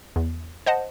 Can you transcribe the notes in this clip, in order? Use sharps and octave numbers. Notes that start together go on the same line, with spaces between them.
E2
C5 D#5 F#5 A5